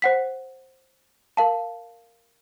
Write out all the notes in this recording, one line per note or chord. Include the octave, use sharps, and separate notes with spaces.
C5 F#5 B6
A#4 F5 A5